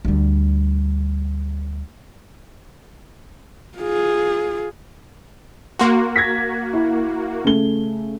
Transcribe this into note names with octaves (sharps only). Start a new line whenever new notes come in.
D2 G3
F4 G#4
A#3 F#4 C6
G#6 A#6 B6
E4
C#3 A3 G7